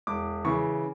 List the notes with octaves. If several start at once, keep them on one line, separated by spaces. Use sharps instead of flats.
E1 D6
C#3 E3 C#6